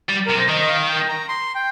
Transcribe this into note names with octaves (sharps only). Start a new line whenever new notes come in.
G3
C3 A#4
C5
D#3 D#5
D#5
F5
G5
A#5
C6
G5